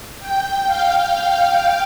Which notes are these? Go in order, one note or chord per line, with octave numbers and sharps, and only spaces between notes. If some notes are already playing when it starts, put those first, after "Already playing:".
G5
F5